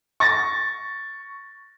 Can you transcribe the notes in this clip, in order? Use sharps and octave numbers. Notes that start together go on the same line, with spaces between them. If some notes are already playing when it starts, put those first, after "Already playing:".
C#6 A6 A#6